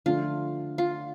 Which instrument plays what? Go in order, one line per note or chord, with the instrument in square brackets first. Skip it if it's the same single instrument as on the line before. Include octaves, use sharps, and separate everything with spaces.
[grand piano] D3 F3 A3 D4 [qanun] F4
[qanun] F4